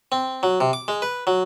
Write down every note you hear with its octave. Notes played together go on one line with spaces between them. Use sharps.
C4
F#3
C3
D6
G#3
B4
F#3